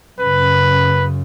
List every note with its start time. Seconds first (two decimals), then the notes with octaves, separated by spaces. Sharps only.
0.20 F#2 C#3 B4